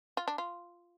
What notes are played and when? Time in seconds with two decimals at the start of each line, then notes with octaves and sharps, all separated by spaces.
0.17 F4
0.28 D4
0.38 F4